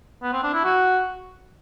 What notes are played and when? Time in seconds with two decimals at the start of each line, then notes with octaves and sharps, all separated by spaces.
0.22 B3
0.32 C4
0.43 D4
0.53 E4
0.64 F#4